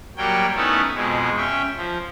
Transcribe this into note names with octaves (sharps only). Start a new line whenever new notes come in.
F#3 G3 A#3 C#5 G5
A3 B3 C#4 D#4 E4
F2 B2 G#3
C#4 E5 G5
F3